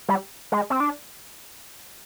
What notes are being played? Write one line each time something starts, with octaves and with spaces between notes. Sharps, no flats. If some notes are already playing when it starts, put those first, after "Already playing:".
G3
G#3
C4
D4